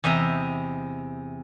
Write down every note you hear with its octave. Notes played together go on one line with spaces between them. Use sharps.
E2 C3 D#5 E5 A#5